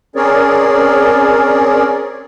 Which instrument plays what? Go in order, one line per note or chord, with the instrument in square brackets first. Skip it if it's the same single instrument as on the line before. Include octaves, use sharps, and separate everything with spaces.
[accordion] C4 C#4 G#4 A#4 C#5 D5